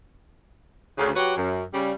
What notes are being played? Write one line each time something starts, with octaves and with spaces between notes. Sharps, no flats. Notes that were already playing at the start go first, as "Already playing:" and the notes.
D2 C#3
F#3 F#4 G4 B4 C#5
F#2
C#3 G3